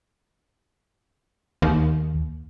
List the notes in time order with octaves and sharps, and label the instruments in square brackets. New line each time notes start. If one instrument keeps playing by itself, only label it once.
[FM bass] D#2